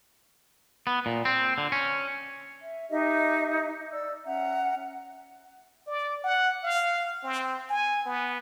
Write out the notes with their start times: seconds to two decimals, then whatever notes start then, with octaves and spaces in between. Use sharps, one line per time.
0.87 B3
1.06 A#2
1.25 C4
1.58 D3
1.72 C#4
2.61 E5
2.90 D#4 G4 D#5 E5
3.93 D5 E6
4.25 C#4 E5 F#5 A#5
5.87 D5
6.24 F#5
6.64 F5
7.23 C4
7.70 G#5
8.06 B3